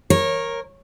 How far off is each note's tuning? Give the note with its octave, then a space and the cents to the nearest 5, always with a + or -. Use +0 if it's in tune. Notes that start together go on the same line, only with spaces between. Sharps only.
A#4 +0 C#5 -25